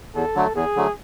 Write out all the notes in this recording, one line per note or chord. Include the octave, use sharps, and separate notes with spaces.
E2 A4
D3 F#3 A3
E2 G#4
D3 F#3 A3